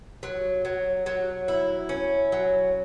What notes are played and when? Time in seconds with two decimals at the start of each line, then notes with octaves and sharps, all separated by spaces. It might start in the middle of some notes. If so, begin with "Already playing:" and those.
0.23 F#3
0.65 F#3
1.06 F#3
1.48 E4
1.89 C#4
2.32 F#3